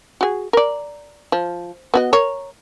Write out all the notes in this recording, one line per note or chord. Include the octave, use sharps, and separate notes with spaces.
F#4 G#4
A#4 D5
F3
B3 F#4 D#5
A#4 C#5